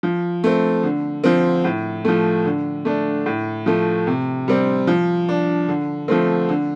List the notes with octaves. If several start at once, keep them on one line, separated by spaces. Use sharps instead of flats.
F3
A3 C4
D3
F3 C4
A2
F3 A3
D3
A3 D4
A2
F3 A3
C3
G3 C4
F3
D4
D3
F3 A3 C4
D3